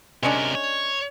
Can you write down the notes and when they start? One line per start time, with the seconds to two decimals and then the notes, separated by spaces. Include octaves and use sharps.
0.23 C3 G#3 C#4 D4 A#4
0.55 C#5